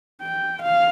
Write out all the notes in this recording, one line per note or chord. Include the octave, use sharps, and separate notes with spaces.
G5
F5